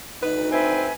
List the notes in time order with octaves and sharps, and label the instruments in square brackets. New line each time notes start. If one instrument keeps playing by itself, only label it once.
[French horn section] D2 D#4 [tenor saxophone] B4
[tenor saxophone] C4 [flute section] B4 E5 G#5